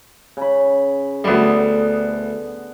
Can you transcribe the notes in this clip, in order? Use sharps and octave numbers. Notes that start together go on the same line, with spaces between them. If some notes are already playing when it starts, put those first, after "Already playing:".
C#3 B5
D2 D3 G3 B3